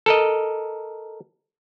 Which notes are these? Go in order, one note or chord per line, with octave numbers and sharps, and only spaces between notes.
A4 A#4 D#5